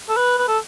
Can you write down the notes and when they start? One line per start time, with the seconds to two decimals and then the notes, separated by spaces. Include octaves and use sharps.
0.09 A4
0.17 B4
0.38 B4
0.48 A4